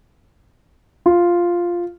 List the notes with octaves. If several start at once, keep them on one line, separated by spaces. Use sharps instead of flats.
F4